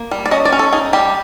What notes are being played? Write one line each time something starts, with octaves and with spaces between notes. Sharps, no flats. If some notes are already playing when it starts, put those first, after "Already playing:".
Already playing: A#3
G3
D5
C#4 D#5
D5
C#4
A4
D#4 G#4
G3 G4